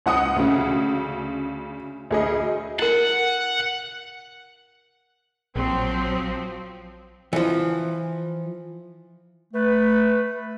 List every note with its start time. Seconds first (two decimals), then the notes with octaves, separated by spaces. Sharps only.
0.06 C#2 F#5 D#6 C#7
0.36 D2 C#3
2.11 D2 G#4 D#5
2.79 E4 A#4 F#5
5.56 A#1 F3 F#3 C4
7.33 E3 F3
9.53 A3 B4